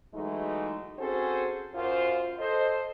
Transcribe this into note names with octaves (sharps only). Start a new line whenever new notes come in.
E3 F#3 G#3 A3 D#4 E4
C4 C#4 F#4 G#4 A4 C5
F#2 F4 C5
A4 C5 D#5